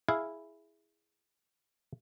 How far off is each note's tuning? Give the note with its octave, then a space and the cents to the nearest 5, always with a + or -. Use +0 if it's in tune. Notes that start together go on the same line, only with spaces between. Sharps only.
E4 +0 G#4 +0 F5 +0